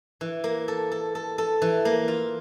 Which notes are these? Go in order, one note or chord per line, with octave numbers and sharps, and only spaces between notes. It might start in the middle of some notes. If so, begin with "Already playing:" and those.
E3
A#3
A4
A4
A4
A4
E3
A#3
F4